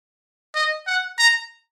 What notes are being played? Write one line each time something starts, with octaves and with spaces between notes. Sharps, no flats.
D#5
F#5
A#5